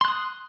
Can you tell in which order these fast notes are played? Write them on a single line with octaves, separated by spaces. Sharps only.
C6 F#6 D#6